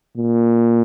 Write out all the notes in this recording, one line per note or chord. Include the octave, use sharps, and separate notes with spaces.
A#2